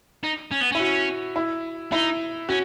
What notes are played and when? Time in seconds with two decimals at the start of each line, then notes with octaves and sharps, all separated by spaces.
0.23 D#4
0.51 C#4
0.61 B3
0.72 C#4 E4
0.80 F#4
1.36 E4
1.92 D#4 E4
2.49 C#4 F#4